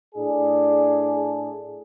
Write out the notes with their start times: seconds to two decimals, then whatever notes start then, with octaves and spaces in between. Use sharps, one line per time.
0.15 A2 D4 G#4